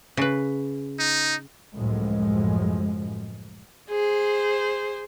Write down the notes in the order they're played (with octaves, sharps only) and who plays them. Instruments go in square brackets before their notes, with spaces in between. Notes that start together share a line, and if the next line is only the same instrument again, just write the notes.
[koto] C#3 B4
[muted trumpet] D#4
[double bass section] C#2 F#2 A2 F3 G#3
[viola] G#4 C5